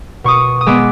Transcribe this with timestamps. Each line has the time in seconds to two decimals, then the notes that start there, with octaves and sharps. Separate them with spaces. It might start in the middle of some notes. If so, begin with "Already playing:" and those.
0.24 B2 C#6 D#6
0.61 D#6
0.66 G#3 B3 D6 E6